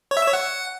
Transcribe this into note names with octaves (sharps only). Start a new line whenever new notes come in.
C#5
E5
E6
C#5
F#5